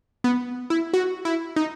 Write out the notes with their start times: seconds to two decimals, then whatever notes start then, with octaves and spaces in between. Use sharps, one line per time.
0.24 B3
0.70 E4
0.93 F#4
1.25 E4
1.56 D#4